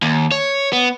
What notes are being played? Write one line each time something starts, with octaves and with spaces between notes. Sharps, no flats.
D#2
C#5
B3